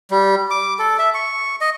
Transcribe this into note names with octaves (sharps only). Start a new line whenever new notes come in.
G3
D6
A4
E5
C#6
D#5